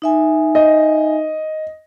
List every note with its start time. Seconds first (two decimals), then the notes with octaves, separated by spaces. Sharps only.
0.02 D#4 E5 G#5
0.55 D#5